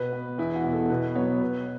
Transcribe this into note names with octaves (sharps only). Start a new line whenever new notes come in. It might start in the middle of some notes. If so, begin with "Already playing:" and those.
Already playing: B2 B4
B3
E2 E4
F#4
B2 B3
A4
A4
B2 B4
F#3 B3 C#5
B2 B4